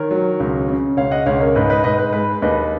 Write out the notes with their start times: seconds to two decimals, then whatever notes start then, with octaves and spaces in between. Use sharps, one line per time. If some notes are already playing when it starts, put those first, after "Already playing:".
Already playing: D#3 A#4 C#5
0.11 F#3
0.40 C#2
0.68 C#3
0.97 C#2 C#5 F5
1.11 D#5 F#5
1.26 C#2 C#5 F5
1.41 A#4 C#5
1.55 G#2 B4 D#5
1.70 B4 D#5
1.84 G#2 B4 D#5
1.98 B4
2.13 G#3 B4
2.42 D#2 B4 D#5